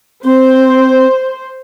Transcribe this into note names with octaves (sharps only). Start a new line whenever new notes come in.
C4 C5